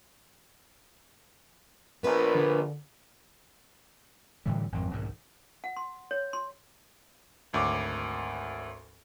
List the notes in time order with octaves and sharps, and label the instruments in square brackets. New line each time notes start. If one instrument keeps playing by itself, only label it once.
[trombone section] A#1 A#2 [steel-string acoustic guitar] B3 D4 B4
[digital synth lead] D3
[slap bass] A2 D3 E3 G3
G#1 F2
B1 G#2 D#3
[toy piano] F#5
C6
C#5
C6
[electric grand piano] G#1 D2 C#5 D6